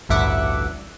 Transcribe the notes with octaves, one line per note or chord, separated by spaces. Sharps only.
A1 D2 G2 E5 F#5 D6